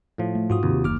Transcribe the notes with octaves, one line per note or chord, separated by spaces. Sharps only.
A2 F3
A3
G#2 F4 F#4 D#6
D#2 C3
F#1 A#3 D6 F6